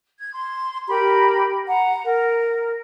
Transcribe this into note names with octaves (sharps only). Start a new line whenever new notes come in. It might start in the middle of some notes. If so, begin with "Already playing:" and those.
G#6
C6
G4 A#4 B5
F#5 A#5
A#4